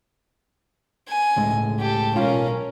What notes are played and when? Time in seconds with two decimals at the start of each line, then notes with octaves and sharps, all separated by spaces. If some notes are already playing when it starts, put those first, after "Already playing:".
1.08 G#5
1.36 C#2 A2 G#3
1.79 G4 A4
2.15 B1 C#4 F4 A#4 F5